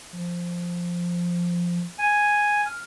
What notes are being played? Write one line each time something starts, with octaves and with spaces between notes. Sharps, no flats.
F3
G#5
F6